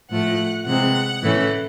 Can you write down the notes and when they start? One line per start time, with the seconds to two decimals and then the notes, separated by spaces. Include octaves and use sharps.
0.11 A2 F3 A3 F#5
0.66 C3 E3 G#3 C4 F#5
1.22 A2 E3 A3 C#4